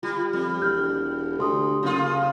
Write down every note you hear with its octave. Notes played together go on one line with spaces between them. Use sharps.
G3 F4
F2 G3
E1 F6 G6
D2 A4 C6 D#6
F#1 C#3 F4